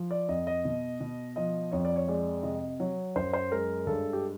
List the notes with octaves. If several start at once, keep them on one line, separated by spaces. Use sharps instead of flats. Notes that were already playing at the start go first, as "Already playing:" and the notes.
Already playing: F3
D5
F2 D#5
D#5
B2
B2
F3 D#5
F2 C#5
D5
C#5
G#3 D5
C3 D#5
F#3
F#2 C5
C5
G#3 A#4
G2 A4
G4